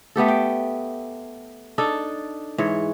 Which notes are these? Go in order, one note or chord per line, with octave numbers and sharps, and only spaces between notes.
A3 B3 G4 A4
G5
D4 D#4 A4
G#2 E3 C#5